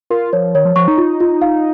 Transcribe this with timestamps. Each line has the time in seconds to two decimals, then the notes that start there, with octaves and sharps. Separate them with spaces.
0.10 F4 A#4
0.33 F3 C#5
0.55 D#3 C#5
0.65 F3
0.76 F3 C#6
0.88 D#4
0.98 F4
1.20 F4
1.42 F5